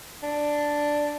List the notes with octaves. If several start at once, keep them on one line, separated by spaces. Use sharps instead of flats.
D4